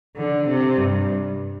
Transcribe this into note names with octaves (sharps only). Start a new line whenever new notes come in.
D3
C3
G2